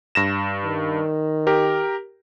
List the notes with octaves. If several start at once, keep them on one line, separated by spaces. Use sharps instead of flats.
G2 A#6 E7
D#3
G4 A#4